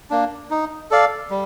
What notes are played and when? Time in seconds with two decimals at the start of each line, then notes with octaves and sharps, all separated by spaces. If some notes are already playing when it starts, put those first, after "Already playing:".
0.10 A#3 D4
0.51 D#4
0.91 A4 D5 F5
1.30 G3